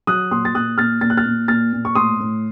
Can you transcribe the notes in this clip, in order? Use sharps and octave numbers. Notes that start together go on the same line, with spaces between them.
F#3 D#6 F#6
A#2 C6 D#6
A6
A#2 D#6 F#6
A#2 F6 A6
A#2 A6
F#6
F6 A6
A#2
A#2 F6 A6
A#2
C#6
A2 C6 D#6
A2